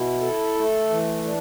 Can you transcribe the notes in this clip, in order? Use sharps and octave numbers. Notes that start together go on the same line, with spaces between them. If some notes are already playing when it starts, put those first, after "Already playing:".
Already playing: B2 E4
A4
A3
E3
D4